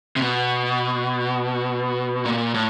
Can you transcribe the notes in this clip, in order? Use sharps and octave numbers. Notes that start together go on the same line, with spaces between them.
C3
B2
A#2
A2